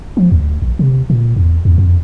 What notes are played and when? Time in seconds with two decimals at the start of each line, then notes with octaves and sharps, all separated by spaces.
0.17 F3
0.32 D2
0.62 A#1
0.79 C3
1.10 A#2
1.36 E2
1.65 E2
1.78 F2